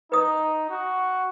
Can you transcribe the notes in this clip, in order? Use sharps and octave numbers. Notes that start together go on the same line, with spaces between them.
D#4 B4 D#6
F#4